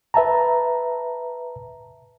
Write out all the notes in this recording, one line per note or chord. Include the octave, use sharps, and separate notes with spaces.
B4 E5 A5 A#5